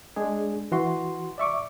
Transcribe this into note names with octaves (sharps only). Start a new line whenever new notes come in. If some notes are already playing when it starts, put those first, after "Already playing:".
G#3 D4 G#4
E3 F#4 C6
D5 E5 C#6 D6